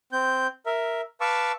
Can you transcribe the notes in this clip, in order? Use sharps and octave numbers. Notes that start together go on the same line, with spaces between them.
C4 G6
A#4 E5
B4 F5 A5 C#6 D6 E6